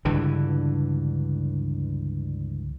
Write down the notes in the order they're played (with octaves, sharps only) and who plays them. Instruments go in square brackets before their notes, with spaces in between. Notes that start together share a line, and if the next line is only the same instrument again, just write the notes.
[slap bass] C#2 G2 D3 E3